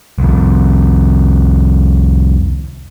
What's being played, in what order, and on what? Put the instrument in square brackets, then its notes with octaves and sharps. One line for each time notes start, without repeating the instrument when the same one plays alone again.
[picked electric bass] C2 F2